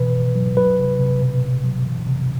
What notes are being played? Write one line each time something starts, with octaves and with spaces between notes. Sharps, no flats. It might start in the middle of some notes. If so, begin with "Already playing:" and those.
Already playing: B2 E3 B4
B2
F#3
F#3 B4
C3
C3
B2
B2
F#3
E3
C3